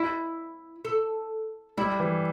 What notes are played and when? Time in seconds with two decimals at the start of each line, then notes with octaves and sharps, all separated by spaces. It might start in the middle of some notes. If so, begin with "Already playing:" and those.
Already playing: E4
0.85 A4
1.77 G3 E4
2.00 E3